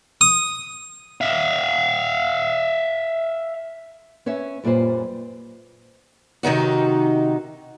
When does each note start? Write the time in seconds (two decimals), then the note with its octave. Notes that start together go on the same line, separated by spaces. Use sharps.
0.21 D#6
1.21 E5 F5
4.26 C#4 B4 C#5 E5
4.64 F#2 A#2 G3 B4 C5
6.43 C3 D#3 D#4 F#4